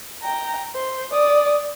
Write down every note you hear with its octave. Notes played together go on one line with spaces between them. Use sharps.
G5 A#5
C5
D5 D#6